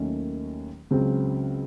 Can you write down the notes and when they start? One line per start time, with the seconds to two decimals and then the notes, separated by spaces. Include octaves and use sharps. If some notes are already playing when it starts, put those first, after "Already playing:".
Already playing: D#2 D#3 F#3 A3 C#4
0.91 C#2 C#3 F#3 C4